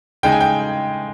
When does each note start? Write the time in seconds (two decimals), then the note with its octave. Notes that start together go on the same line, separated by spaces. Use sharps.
0.23 C#3 G#3 D#4 G5
0.32 G#5
0.41 G5